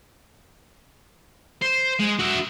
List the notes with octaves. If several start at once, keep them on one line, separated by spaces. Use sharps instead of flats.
C5
G#3
F#4 E5